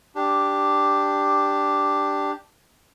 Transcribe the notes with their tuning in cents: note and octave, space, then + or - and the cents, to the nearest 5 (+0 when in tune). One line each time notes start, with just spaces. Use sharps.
D4 +0 G4 +0